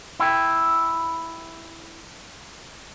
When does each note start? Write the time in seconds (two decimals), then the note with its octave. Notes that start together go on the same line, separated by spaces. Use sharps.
0.20 E4 G5